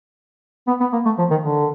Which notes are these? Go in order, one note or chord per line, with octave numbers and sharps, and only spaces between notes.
B3
B3
A#3
A3
F3
D#3
D3